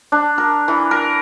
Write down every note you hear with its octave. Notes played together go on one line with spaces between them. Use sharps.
D4
A#4
E3
A#4